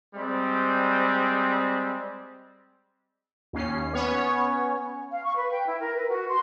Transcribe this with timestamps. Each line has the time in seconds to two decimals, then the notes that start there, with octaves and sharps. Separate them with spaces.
0.14 G3 G#3 C4
3.53 D#2 C#4 C7
3.93 B3 C#4 C#5
5.11 F5
5.24 C#6
5.36 B4
5.51 G5
5.67 E4
5.79 A#4
5.96 B4
6.10 F#4
6.29 C6